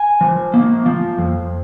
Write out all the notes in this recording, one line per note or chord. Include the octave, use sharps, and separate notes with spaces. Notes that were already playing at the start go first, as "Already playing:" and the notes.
Already playing: G#5
F3
A#3
F3
F2